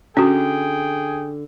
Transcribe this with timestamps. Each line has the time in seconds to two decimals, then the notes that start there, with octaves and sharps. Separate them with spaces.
0.17 D3 C#4 F#4 G#4 G5